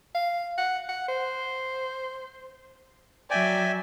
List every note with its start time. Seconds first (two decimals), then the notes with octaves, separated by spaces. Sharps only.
0.15 F5
0.58 F#5
0.89 F#5
1.08 C5
3.30 F#3 D5 E5 G5 G#5